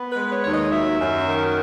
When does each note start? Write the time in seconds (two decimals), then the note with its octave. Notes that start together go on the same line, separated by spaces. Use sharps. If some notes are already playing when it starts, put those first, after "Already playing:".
Already playing: B3
0.10 B4
0.16 G#3
0.31 C#5
0.43 D#2 C#5
0.52 D#5
0.72 F#3 E5
1.00 F#2
1.28 D#3